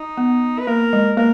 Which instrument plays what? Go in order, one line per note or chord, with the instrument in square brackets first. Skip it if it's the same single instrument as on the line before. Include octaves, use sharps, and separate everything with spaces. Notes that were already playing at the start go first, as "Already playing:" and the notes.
Already playing: [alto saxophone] D#4
[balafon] B3
[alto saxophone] B4
[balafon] A#3 [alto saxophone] A#4
[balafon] G#3
[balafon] A#3 [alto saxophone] A#4